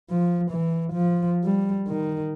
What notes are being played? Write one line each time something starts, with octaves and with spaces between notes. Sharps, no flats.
F3
E3
F3
G3
D#3